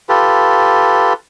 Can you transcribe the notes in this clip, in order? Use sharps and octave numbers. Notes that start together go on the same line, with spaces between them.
F4 G4 A4 B4